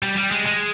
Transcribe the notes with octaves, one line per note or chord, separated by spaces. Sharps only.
G3
G3
G#3
G#3